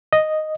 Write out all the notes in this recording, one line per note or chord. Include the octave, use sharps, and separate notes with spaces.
D#5